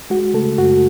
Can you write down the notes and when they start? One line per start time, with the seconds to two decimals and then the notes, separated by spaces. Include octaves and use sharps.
0.10 G#3 F#4
0.34 C#3 A3 A4
0.58 F#2 F#4